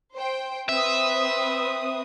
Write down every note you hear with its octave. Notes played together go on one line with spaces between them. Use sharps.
C5 G5
C4 B4 E5 D#6